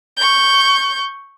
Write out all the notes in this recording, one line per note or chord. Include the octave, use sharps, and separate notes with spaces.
C#6 G6